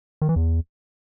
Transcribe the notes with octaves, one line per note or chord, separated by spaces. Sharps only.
D#3
E3
E2